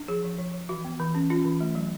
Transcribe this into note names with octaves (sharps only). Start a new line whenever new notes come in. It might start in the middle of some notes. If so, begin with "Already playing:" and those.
Already playing: D4
F3 G#4
F3
F3
F3
E3 F#4
B3
E3
C#4
C#4 F4
E3
A3
F#3